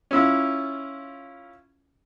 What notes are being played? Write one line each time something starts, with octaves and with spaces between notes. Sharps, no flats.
C#4 E4 F4